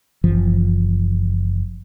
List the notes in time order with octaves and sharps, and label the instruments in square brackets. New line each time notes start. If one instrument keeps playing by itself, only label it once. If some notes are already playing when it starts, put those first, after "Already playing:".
[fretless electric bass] F#1 F#2 E3 F3